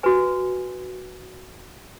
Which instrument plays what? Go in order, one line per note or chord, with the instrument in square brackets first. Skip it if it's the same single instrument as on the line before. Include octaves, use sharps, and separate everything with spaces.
[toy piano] F#4 B4 G#5